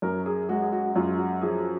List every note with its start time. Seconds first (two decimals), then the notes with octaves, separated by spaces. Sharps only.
0.02 F#2 A#4
0.26 G#4
0.49 G#3 F#4
0.62 G#4
0.72 F#4
0.96 F#2 F4
1.19 F#4
1.41 F3 G#4